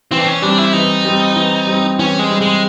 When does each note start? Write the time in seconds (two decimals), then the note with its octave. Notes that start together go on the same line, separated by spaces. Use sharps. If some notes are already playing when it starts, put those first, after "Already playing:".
0.11 E3 C4
0.19 D4
0.26 C#4
0.42 G3 C4 D4
0.58 E4
0.73 E3 D#4
1.05 G3 C4
1.36 E3
1.67 G3 C4
1.99 E3 C#4
2.19 G#3
2.30 G3 C4
2.41 G#3